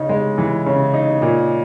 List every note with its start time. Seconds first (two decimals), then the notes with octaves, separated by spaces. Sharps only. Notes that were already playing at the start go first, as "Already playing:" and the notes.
Already playing: C#3 D#4
0.09 G#3
0.38 E3
0.66 C#3
0.94 D#4
1.22 A#2